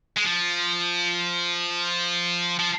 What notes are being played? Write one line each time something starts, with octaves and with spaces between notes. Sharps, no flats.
G#3
F3
F3